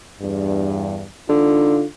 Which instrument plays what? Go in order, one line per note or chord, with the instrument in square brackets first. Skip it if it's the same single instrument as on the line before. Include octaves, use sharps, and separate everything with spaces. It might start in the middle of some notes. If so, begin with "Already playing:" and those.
[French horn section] E2 G2
[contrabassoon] D3 [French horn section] D#4 F4